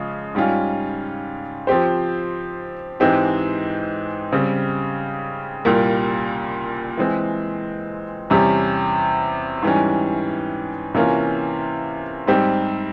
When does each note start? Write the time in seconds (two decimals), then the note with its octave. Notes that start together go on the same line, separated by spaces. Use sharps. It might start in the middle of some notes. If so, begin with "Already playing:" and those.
Already playing: C#3 F3 G#3
0.35 G#2 G3 C#4 F4
1.67 F3 C4 G4 C5
3.00 G#2 E3 G#3 C4 G4
4.32 C#3 G3 C4
5.65 C2 A#2 G3 A#3
6.97 E3 G#3 C4
8.30 E2 C3 G3 C#4 G4
9.62 G#2 E3 G3 C#4
10.94 C3 E3 A#3 C#4 F4
12.27 G#2 G3 C4 G4